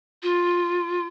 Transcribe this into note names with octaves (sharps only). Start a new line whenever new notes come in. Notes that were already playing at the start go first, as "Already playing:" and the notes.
F4